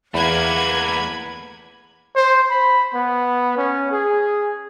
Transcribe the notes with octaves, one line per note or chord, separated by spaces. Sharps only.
E2 A3 A#3 B4 F#5 B5 G#6
C5
B5
B3
C#4
G#4